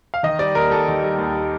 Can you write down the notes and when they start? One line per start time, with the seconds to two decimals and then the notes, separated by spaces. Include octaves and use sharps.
0.14 F5
0.23 D#3 D#5
0.39 G3 D5
0.55 D#2 A#4
0.71 D#2 A4
0.88 D#3
1.03 G3
1.19 D#2